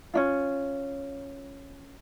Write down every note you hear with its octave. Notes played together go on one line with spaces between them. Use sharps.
C#4 D4 F4